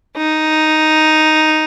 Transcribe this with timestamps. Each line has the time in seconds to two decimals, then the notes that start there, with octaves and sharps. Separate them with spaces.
0.17 D#4